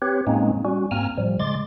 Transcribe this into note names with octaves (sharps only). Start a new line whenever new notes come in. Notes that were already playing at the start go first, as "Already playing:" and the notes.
C4 G4 B4 C#5
A2 G#3 A#3 C4 C#4 D#4
G3 C#4 F#4
G#2 A#3 C4 G#5 A#5 F6
A2 F3 G3
C#3 G#3 C6 D6 A6